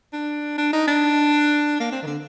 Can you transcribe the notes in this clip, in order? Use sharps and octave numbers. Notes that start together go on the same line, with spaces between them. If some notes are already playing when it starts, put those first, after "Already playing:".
D4
D4
D#4
D4
A#3
C4
D#3
D3